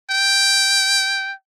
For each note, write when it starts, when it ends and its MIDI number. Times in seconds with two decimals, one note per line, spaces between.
0.10 1.32 79